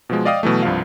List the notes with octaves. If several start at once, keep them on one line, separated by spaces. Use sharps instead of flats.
B2 F3 G#3
D5 D#5 F5 G5 D#6
B2 E3 F#3 A3
C2 G2 F3 F5